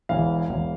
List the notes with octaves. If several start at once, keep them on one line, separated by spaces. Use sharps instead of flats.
E1 E2 E3 F5
E1 E2 E3